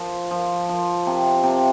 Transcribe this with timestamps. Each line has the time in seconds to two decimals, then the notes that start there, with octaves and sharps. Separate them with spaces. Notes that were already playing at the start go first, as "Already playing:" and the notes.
Already playing: F3
0.31 F3
0.69 F3
1.06 C3
1.43 C3